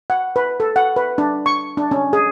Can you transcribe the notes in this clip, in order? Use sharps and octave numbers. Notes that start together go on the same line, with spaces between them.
F#5
B4
A4
F#5
B4
D4
C#6
D4
C#4
G#4